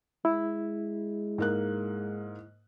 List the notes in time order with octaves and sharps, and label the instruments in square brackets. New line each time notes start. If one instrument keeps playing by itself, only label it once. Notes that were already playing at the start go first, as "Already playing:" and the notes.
[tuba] G#3 [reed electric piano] E4
[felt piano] G#2 A#3 F#6